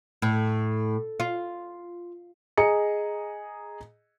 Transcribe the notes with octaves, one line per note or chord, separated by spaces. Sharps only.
A2
F4
G#4 D#5 A#5 C#7